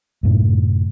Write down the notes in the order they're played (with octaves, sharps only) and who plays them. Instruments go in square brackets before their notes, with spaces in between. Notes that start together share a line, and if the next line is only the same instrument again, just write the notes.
[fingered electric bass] F#2 A2 C3